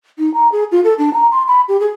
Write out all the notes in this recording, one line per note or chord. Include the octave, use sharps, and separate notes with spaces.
D#4
A#5
G#4
F4
A4
D4
A#5
C6
B5
G4
G#4